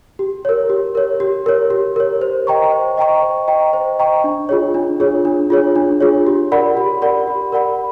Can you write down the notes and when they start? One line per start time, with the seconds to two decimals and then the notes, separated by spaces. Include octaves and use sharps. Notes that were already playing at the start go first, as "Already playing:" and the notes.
0.19 G4
0.45 A#4 C#5
0.69 G4
0.95 A#4 C#5
1.20 G4
1.46 A#4 C#5
1.70 G4
1.96 A#4 C#5
2.21 C5
2.47 D#5 G5 A#5 C#6
2.72 C5
2.97 D#5 G5 A#5 C#6
3.22 C5
3.48 D#5 G5 A#5 C#6
3.73 C5
3.99 D#5 G5 A#5 C#6
4.24 D4
4.49 F4 G#4 C#5
4.74 D4
5.00 F4 G#4 C#5
5.25 D4
5.50 F4 G#4 C#5
5.76 D4
6.01 F4 G#4 C#5
6.27 G4
6.52 A#4 D5 F#5 B5
6.77 G4
7.02 A#4 D5 F#5 B5
7.27 G4
7.52 A#4 D5 F#5 B5